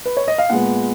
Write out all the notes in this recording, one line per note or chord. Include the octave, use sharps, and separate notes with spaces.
B4
C#5
D#5
F5
A#2 G#3 B3 F#5